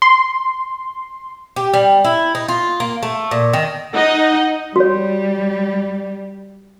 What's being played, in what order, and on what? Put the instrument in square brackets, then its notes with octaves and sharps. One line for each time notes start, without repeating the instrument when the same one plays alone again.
[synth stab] C6
[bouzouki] G4
G3
E4
D#4
F4
A#3
A3
A#2
D#3
[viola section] D#4 D#5 [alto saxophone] F#5
[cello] G3 [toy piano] F#4 C#5